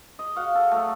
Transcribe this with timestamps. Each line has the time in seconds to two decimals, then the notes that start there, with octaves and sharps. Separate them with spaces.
0.19 D#5
0.36 F#4 F5 F#5
0.55 A4
0.71 F#3 A3